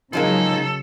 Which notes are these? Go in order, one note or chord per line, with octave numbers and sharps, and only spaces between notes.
C#3 F3 F#3 G#3 A#3 D#4 A4